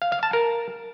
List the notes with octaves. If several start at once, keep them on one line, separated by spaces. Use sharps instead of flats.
F5
F5
A5
A#4